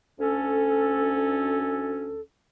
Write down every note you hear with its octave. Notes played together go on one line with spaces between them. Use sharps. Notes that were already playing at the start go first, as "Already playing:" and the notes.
D2 C#4 A4